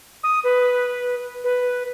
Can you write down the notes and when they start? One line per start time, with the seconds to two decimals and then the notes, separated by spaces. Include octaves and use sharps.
0.24 D#6
0.44 B4
1.44 B4